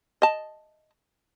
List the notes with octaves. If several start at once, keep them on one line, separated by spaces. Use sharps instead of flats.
D#5 A5